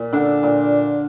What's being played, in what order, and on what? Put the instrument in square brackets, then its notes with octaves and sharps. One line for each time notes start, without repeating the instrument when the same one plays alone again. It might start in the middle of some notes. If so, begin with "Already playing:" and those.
Already playing: [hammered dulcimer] A#2
[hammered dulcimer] D3 [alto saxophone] D4
[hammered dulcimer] A#2